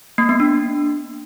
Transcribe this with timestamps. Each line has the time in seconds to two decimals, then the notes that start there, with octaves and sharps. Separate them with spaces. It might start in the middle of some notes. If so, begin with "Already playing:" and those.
0.18 A#3
0.29 B3
0.40 D4